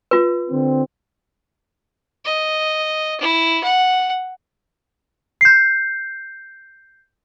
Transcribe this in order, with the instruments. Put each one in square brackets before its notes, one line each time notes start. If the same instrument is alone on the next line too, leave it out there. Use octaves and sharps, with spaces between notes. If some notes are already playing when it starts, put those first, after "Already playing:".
[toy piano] F4 B4
[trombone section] D3 C4
[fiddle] D#5
E4
F#5
[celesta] G6 C7